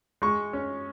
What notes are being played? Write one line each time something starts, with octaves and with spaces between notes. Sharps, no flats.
G#3 C#6
C#4